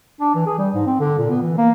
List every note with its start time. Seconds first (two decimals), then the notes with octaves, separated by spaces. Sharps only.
0.21 D4
0.35 E3
0.46 G#4
0.58 G3
0.74 G#2
0.86 C4
1.00 D3
1.18 A#2
1.30 B3
1.41 E3
1.57 A#3